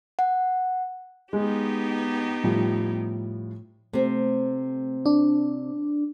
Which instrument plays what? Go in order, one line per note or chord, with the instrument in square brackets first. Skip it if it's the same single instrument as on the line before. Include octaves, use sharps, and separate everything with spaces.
[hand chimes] F#5
[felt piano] G#3 [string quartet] B3 D#4 G4
[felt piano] A2 F3 G3
[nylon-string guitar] C3 C4 [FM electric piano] A3
[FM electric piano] D4